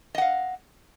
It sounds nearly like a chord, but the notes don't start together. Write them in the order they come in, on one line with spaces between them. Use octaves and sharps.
D#5 F#5 F5